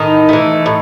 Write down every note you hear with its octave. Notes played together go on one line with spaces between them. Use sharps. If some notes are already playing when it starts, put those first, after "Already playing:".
Already playing: A2 D#3 D#4
E3 A3
A2